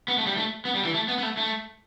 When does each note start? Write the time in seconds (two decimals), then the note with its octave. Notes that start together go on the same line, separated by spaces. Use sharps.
0.08 B3
0.18 A3
0.27 G3
0.37 A3
0.65 B3
0.75 G3
0.85 E3
0.94 A3
1.08 B3
1.18 B3
1.23 A3
1.37 A3